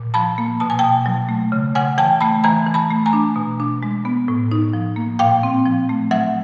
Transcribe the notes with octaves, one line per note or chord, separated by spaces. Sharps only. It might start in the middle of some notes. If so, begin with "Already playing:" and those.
Already playing: A#2
F3 A5 B5
A#3
B2 A5
G#5
B2 G5 A5
F#3
A3
C#3
C#3 F#5 G#5
E3 G5 A5
A3 A5 B5
E3 G#5 A#5
E3
A5 B5
A3
G#5 A#5
D4
B2
D4
G#3
B3
A2
D#4
F3
A#3
A#2 F5 G5
C4
F3
A3
F#3 E5 F#5